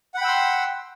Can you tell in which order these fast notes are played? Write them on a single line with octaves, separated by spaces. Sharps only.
F#5 B5 G5 E6 C6